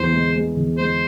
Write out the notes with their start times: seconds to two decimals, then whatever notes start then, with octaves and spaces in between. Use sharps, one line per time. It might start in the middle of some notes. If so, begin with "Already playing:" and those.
Already playing: E2 C5
0.12 G#3
0.35 G#3
0.56 E2
0.78 G#3 C5